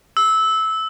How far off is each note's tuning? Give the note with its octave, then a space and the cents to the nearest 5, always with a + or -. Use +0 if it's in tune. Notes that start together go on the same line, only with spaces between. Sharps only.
E6 -15